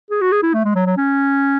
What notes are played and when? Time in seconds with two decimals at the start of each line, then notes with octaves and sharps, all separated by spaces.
0.11 G#4
0.21 F#4
0.32 G#4
0.43 E4
0.54 A3
0.64 G#3
0.75 F#3
0.86 F#3
0.97 C#4